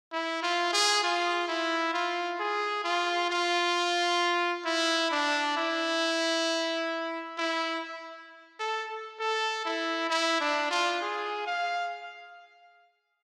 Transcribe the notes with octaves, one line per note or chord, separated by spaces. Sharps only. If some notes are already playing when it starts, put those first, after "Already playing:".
E4
F4
G#4
F4
E4
F4
G#4
F4
F4
E4
D4
E4
E4
A4
A4
E4
E4
D4
F4
G#4
F5